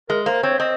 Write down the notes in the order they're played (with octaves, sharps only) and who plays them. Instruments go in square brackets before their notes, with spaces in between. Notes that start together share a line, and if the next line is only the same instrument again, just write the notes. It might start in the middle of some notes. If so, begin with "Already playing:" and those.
[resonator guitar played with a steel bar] G#3 [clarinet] A#4
[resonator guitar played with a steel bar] A#3 [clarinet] C5
[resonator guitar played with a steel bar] C4 [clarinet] C#5
[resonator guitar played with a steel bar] C4 [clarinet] D#5